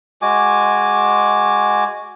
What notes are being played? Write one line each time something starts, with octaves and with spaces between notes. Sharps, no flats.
G#3 F#4 G#5 D6